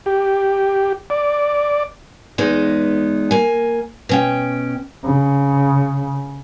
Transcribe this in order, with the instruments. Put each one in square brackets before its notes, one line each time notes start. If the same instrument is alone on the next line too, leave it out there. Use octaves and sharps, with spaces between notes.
[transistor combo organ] G4
D5
[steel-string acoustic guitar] E2 G#3 B3 D#4
A#3 G#5
B2 C#4 G5
[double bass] C#3